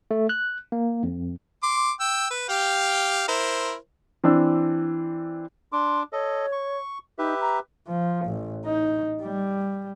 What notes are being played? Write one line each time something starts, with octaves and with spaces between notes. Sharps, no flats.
A3
F#6
A#3
F2
C6 D6
G5 E6
B4
G4 F5 G5
E4 A#4 C5
E3 C4 D4 E6
D4 C6 D6
A4 C#5 D#5
C#6
D#4 G4 B4 E5
A#5
F3
A1
D#4
G3